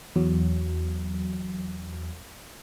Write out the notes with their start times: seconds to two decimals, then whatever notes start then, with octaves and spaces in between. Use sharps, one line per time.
0.16 E2 F#3